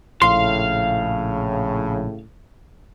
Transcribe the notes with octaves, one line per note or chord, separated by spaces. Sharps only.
A#1 A2 C#3 F5 C6